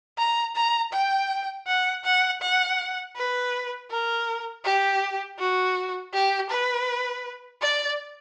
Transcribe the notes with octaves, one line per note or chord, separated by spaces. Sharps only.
A#5
A#5
G5
F#5
F#5
F#5
B4
A#4
G4
F#4
G4
B4
D5